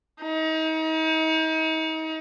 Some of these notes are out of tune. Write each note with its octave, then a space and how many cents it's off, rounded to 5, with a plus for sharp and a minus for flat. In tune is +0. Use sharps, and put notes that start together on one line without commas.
D#4 +35